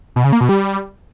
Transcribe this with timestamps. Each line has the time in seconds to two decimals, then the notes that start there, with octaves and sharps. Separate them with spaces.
0.16 B2
0.24 C#3
0.33 A#3
0.41 B2
0.49 G3